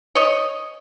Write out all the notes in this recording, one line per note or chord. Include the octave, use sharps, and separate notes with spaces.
C#5 D#5